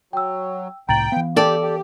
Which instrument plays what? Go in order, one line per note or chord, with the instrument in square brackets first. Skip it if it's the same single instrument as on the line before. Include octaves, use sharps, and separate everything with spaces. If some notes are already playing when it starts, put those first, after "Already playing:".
[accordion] F#3 [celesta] G5 E6
[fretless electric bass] C2 A2 [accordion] G5 [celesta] A#5 A6 F#7
[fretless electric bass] E3 B3 [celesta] F5
[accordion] G4 [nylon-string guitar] A4 D5
[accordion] G4